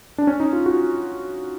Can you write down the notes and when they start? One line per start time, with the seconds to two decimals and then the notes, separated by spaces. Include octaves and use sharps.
0.18 D4
0.27 C#4
0.40 D#4
0.53 F4
0.66 F#4